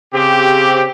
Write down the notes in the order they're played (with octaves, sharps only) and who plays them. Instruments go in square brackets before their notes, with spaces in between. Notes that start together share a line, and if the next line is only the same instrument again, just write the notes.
[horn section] C#3 C4 G4